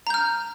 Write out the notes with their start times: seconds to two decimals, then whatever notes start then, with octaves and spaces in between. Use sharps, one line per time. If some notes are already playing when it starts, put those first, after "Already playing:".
0.07 A#5
0.10 G6
0.14 F6